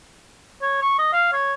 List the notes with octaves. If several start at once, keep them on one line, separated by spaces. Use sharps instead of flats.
C#5
C#6
D#5
F5
C#5